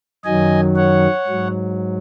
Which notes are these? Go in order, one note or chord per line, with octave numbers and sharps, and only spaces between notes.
F#2 D#3 F#3 D#5 G#5
C#5 F#5
G#2 F#3